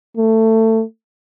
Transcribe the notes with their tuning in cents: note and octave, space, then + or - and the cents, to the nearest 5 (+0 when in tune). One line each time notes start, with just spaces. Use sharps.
A3 +20